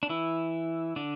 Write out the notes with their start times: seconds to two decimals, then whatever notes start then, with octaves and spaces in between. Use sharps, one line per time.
0.03 D4
0.09 E3 E4
0.96 D3 D4